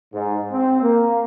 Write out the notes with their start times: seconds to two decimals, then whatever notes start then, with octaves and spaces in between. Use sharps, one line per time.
0.13 G#2
0.52 C4
0.81 A#3